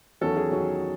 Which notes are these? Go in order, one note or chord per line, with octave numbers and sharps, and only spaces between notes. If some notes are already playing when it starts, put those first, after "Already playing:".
E2 D#3 F#3 C#4 A4
G#4
E2 D#3 F#3 C#4